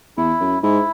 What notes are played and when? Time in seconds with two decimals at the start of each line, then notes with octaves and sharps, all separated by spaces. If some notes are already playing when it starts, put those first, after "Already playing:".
0.17 E2 E4
0.40 F#2
0.63 G#2 E4